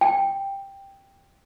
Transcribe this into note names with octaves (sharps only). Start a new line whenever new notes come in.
G5